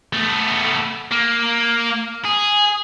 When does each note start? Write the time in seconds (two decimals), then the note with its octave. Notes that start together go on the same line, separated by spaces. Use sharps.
0.13 A3 B3
1.11 A#3
2.25 G#4